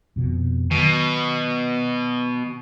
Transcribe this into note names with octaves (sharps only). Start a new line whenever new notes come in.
F2 B2
B2 D#3 F#3